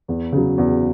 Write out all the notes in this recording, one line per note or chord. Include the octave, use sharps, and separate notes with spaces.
E2
C#3 F#3
E2